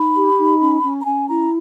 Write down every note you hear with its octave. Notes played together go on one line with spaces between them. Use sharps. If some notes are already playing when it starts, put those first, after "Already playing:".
Already playing: D#4 B5
G4
D#4
C#4
C#4
A#5
C#4 G#5
E4 A#5